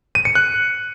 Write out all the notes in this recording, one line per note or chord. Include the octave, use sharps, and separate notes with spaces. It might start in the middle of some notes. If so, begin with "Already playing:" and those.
D#7
C#7
F#6